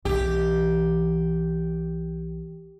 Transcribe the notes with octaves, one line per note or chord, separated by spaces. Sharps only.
B1 E3 G4